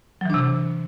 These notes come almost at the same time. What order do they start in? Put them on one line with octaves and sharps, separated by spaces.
F#3 E3 D4 C3